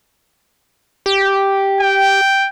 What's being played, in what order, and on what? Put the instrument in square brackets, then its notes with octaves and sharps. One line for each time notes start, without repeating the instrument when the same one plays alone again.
[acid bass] G4
[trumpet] G5